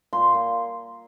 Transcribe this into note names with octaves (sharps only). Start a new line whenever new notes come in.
A#2 C6
A#2